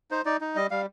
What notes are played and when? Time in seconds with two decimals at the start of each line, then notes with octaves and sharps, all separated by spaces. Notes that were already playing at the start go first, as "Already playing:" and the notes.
0.11 D#4 C5
0.25 D#4 D5
0.41 D#4
0.55 G3 D#5
0.71 G3 F5